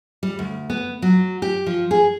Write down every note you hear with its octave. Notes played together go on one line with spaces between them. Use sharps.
G3
D2
B3
F#3
G4
F3
G#4